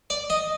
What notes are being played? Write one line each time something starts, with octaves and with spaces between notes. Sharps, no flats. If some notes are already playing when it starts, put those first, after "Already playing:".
D5
D#5